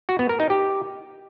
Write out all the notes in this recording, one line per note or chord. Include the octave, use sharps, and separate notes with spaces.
F#4
B3
A#4
D#4
G4